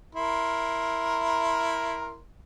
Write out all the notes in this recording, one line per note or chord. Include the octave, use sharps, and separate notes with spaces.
E4 A#4 C6